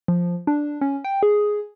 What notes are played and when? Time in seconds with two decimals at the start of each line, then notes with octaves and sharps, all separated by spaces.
0.08 F3
0.47 D4
0.81 C#4
1.05 G5
1.23 G#4